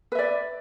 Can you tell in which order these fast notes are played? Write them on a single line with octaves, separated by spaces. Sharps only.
B4 E5 D5